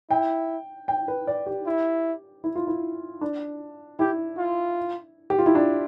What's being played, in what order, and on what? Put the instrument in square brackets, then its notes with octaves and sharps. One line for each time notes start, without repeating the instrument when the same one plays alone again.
[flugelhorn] E4 [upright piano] G5
[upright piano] G5
B4
D5
G4
[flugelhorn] E4
[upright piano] E4
F4
E4
D4
[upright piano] E4 [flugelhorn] G4
[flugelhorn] F4
[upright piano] G4
F4
E4
D4